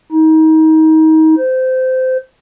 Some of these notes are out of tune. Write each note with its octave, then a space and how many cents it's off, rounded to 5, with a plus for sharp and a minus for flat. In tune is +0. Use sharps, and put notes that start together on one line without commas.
D#4 +30
C5 -20